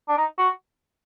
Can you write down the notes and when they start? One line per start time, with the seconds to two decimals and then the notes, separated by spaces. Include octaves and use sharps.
0.09 D4
0.18 D#4
0.38 F#4